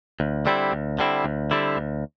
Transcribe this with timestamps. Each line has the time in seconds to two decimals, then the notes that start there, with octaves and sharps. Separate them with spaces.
0.20 D2
0.46 D3 G3 C4 E4
0.72 D2
0.99 D3 G3 C4 E4
1.24 D2
1.51 D3 G3 C4 E4
1.77 D2